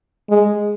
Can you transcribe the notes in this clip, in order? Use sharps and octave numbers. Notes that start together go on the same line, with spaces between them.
G#3